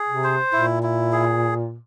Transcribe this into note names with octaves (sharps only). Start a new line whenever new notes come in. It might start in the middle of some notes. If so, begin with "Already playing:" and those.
Already playing: G#4
C3
C5
A#2 E4
E4
G#4